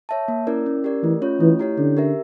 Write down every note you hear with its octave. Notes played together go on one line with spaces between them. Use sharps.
C#5 E5 A5
A#3
C#4 E4 A#4 D5
C#4
G4 A#4 D5
E3 A3
C#4 F4 C#5
E3 A3
E4 G4 C#5
D3 C#4
G4 A#4 E5